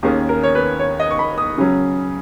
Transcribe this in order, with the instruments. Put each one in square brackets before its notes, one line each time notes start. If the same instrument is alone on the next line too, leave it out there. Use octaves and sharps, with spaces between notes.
[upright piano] D#2 D#3 A#3 C#4 G#4
A#4
C#5
B4
C#5
D#5
C#6
B5
D#6
C#3 F#3 C#4